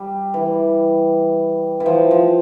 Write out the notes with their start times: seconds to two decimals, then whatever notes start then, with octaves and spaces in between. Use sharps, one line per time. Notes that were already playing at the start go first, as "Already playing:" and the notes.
Already playing: G3
0.34 E3
1.80 E3
1.86 F3
2.11 F3